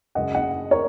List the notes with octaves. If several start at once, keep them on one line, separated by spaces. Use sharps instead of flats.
F#2 C#3 G#3 D#5 F#5
D#5 F#5
A#4 C#5